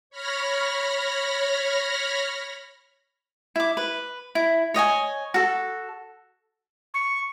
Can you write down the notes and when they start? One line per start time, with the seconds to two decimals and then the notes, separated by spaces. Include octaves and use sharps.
0.10 C#5 B5 F6 A#6
3.56 E4 D6
3.77 B4
4.35 E4
4.74 C#5 D#5 G5 G#5
5.34 F#4 A4
6.94 C#6